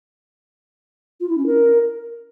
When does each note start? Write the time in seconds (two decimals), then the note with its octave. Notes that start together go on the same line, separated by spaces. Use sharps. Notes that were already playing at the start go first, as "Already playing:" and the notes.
1.20 F4
1.29 E4
1.38 C#4
1.46 A#4